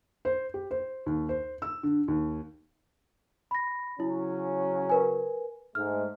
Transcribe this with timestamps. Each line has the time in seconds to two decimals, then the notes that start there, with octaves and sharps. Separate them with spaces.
0.25 C5
0.54 G4
0.71 C5
1.06 D#2
1.29 C5
1.62 E6
1.83 D3
2.08 D#2
3.51 B5 A#6
4.00 C#3 F#3 C#4 E4
4.90 A#4 B4 G#5
5.75 G#2 A3 F6